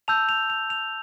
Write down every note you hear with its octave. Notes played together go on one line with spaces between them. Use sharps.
A5 E6 G6 F7
F7
F7
F7